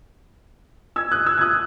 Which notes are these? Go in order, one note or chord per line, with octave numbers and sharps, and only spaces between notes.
E6 G#6
D#6 F#6
E6 G#6
G#6
D#6 F#6